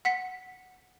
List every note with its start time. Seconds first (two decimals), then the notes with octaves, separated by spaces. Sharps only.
0.05 F#5 B6 C#7